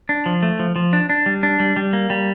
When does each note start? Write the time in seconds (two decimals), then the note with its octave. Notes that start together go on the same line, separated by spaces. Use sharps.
0.09 D4
0.26 F3
0.43 A3
0.59 F3
0.76 F3
0.93 D4
1.09 D4
1.26 G3
1.43 D4
1.60 G3
1.76 G3
1.93 A#3
2.10 G3